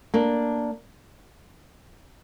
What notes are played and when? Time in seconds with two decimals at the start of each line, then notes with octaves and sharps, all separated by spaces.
0.14 A#3 D4